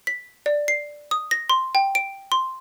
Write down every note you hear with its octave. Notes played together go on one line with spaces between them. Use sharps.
B6
D5
C7
D#6
A#6
C6
G5
D7
C6